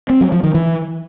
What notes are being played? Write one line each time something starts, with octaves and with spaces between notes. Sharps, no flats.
C4
F#3
F3
D#3
E3